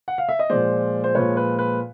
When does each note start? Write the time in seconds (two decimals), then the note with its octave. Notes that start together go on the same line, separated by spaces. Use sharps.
0.08 F#5
0.18 F5
0.29 E5
0.39 D#5
0.50 A#2 F3 G#3 C5 D5
1.04 C5
1.15 A#2 F3 G#3 B4 C#5
1.37 B4
1.59 B4